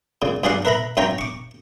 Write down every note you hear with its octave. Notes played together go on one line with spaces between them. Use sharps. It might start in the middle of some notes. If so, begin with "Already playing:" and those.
A#2 C#3
G2 F#3 G#4 D5 F5 F#5
A#4 B4 E5 A#5 B5
F#2 F4 C#5 G5 A#5
C#6 D6